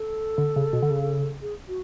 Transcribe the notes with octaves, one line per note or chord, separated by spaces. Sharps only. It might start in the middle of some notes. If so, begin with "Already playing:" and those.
Already playing: A4
D3
C#3
B2
D3
C#3
G#4
F#4